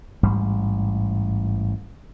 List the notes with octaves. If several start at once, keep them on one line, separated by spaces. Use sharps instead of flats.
A1 G#2 G3